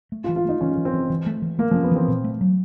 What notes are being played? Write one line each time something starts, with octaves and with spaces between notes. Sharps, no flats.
A3
F4
E3
F4
A3 D#4
E3 C#4
E3
C4
E3
E3
A3
E3
A3 A#3
F3
C#4
B3
E3 C4
A#2
A3
F#3